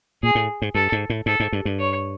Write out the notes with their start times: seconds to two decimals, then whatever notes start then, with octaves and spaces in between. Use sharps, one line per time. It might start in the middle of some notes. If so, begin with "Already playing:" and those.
0.23 A#2 G#4
0.35 A2
0.62 G#2
0.75 G2 A4
0.92 G#2
1.10 A2
1.26 G#2 A4
1.40 G#2
1.53 G2
1.65 G2
1.78 C#5